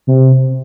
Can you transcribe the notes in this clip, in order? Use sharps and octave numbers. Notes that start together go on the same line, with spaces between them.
C3